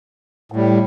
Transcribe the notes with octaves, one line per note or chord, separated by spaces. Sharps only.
A2 G3